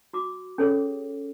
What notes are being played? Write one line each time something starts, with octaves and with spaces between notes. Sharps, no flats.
F#4 D6
C#4 G#4 A4 C#5